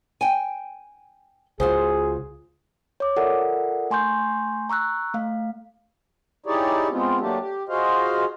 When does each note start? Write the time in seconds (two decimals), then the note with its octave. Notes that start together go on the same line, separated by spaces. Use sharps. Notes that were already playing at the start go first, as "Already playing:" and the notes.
0.21 G5 G#5
1.60 C#2 F4 F#4 G#4 C5
3.00 C#5 D6
3.16 F4 A4 A#4 D5 E5 F#5
3.90 A3 G#5 C6 C#6 G6
4.69 A#5 C#6 E6 F#6
5.14 A3 F5
6.46 D#4 E4 G4 G#4 C#5 D5
6.91 G#3 B3 C4 F4
7.20 F#3 A3 A#3 D4 G4
7.40 G4
7.69 F4 F#4 G#4 C5 D#5 F5